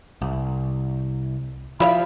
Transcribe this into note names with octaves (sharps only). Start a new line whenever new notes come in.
C2
F3 E4 E5 F5 B5